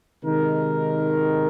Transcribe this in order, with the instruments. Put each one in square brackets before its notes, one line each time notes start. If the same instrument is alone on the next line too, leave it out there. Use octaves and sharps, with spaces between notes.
[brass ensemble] C3 D#3 G#3 D#4 A#4